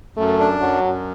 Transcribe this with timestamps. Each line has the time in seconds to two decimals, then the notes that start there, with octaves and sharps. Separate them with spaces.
0.17 F#2 A3
0.39 D4
0.60 F#2 F#3
0.83 F#2